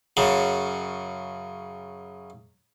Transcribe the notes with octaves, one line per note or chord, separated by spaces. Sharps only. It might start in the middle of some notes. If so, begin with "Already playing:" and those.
F#2 C#3